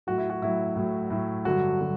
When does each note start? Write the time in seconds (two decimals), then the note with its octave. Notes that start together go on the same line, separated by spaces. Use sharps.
0.07 A2 F#3 F#4
0.18 E4
0.30 F#4
0.42 A2 F#3 E4
0.76 A2 F#3
1.10 A2 F#3
1.45 G2 D3 F#3 F#4
1.81 D3 F#3